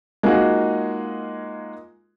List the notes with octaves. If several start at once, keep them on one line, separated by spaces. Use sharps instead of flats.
G#3 A#3 D#4 F4 F#4 G#4